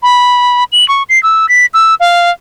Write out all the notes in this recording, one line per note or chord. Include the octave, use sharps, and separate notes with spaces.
B5
F#7
C#6
C7
E6
B6
E6
F5